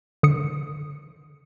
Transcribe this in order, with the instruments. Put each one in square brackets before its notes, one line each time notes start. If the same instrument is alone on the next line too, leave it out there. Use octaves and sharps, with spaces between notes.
[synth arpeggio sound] D3 D#6 C#7